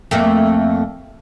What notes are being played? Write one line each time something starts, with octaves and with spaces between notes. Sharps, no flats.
F2 A3 A#3